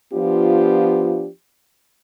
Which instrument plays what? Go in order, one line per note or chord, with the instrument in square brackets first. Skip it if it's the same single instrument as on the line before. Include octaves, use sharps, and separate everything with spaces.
[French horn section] F3 B3 D4 F4 G4